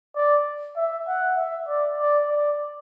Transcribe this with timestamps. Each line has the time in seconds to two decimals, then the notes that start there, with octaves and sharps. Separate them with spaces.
0.16 D5
0.76 E5
1.07 F#5
1.37 E5
1.68 D5
1.98 D5
2.29 D5